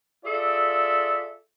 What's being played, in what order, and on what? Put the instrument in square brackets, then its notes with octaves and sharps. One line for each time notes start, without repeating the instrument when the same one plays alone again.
[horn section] F4 G#4 A4 D5 E5